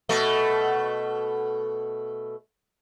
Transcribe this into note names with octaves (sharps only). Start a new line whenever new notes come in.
B2 A3